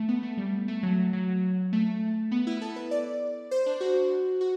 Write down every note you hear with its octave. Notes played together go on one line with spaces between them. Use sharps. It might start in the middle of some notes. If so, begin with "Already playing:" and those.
Already playing: A3
B3
A3
G3
A3
F#3
F#3
A3
B3
E4
A4
B4
D5
C5
D4
F#4
F#4